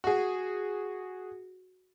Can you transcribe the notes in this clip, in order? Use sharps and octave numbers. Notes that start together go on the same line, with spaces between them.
F#4 G#4